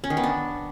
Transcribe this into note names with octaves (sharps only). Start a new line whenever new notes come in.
C#4
D#3
B3
D4